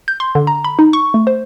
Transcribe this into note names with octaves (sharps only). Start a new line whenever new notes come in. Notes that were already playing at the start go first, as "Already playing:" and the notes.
G6
C6
D3
A#5
B5
D#4
C#6
A3
C5